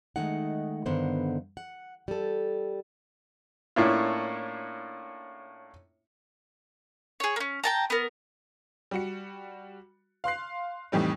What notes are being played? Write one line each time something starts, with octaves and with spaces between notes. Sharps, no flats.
D#3 G#3 A3 D#4 F#5
G2 D3 D#3 B3 C5 F#5
F#5
G3 A4
A2 A#3 C#4 D4 E4 F4
G#4 C#5
A#3 C#4
G5 A5 A#5
B3 A#4
G3 F#4 C#7
F5 C6 F#6 C7
F2 A2 E3 G3 D#4